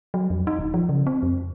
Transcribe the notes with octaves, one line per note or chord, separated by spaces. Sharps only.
F#3
F2
D#4
D1
F3
C#3
C4
F2